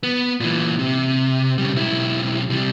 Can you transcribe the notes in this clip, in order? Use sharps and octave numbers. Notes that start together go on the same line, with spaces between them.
B3
A#2 E3
C3
C#3 G3
B1 E4
C3 G3